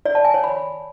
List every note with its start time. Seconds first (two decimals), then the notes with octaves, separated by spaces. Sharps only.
0.06 D5
0.15 A5
0.25 G#5
0.34 C#5
0.44 B5